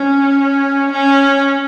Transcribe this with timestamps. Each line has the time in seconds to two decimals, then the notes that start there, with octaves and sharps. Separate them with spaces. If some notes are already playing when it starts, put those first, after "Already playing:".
Already playing: C#4
0.92 C#4